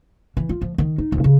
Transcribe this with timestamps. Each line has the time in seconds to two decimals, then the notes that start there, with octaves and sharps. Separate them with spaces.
0.37 E3
0.49 F4
0.62 F3
0.78 D#3
0.98 D#4
1.12 D#1
1.24 C#3